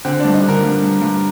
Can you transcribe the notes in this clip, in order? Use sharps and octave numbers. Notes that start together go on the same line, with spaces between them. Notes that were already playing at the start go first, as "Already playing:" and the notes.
D3 C4
G2 D4
D#4
D3
A#4
G2
G2
G2